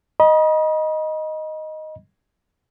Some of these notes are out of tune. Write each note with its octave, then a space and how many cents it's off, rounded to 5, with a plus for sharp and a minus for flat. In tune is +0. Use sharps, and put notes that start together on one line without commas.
D#5 +0 B5 -45